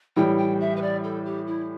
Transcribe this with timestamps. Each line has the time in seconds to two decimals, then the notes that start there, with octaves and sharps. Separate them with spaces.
0.16 A2 E3 G3 G5
0.38 G5
0.60 E5
0.76 B4
0.82 D5
1.04 A4
1.26 G4
1.47 E4